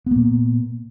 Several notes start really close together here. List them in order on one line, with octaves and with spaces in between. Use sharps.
B3 A#3 A#2